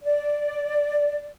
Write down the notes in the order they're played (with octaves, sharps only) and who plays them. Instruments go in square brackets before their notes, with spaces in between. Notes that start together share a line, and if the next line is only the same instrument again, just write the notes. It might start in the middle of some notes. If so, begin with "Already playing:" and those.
[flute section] D5